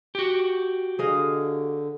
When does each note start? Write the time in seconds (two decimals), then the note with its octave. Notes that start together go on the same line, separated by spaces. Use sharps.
0.15 F#4 G4
0.99 D3 G#4 D#5 F5